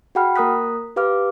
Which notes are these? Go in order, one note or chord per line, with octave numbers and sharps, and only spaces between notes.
F#4 G#4 F#5 G5 B5 F6
A#3 A#4 A#5 D#6 F#6 B6
G4 B4 F5 D6 F6